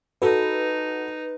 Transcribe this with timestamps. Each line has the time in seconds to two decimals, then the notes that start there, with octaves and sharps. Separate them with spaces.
0.22 D#4 F#4 A4 B4